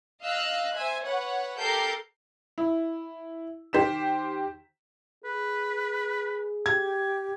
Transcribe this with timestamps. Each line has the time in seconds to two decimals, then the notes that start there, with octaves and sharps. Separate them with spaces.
0.22 D#5 F5 E6 F#6
0.75 C5 E5 G#5
1.06 B4 C#5 F#5
1.60 G4 A4 A#4 G6 C7
2.58 E4
3.73 D#3 G4 C5 B6 E7
5.24 G#4 B4
6.66 G4 G#6